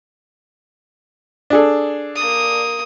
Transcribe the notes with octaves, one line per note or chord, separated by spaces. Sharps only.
D4 G#4 A4
A#3 D#6